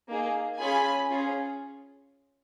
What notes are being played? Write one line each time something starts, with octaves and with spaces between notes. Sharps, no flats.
A#3 D#4 G#4
C#4 F4 G#4 G#5 B5
C#4 F4 G#4